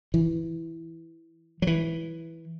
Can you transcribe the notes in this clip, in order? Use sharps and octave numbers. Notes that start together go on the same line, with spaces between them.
E3
F#3
E3